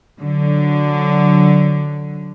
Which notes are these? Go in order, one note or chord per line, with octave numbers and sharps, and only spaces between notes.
D3 F#3